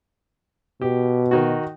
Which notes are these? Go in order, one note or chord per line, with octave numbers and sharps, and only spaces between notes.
B2 G4
D#3 D#4 F#4